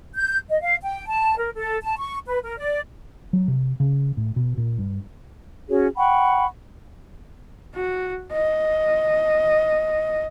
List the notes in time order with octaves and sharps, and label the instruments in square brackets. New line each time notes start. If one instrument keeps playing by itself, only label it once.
[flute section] G6
D#5
F5
G5
A5
A#4
A4
A5
C#6
B4
A#4
D5
[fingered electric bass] F#3
C3
C#3
A2
B2
A#2
G2
[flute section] C#4 F#4 G#4 C#5
F#5 G5 B5 C#6
[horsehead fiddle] F#4
D#5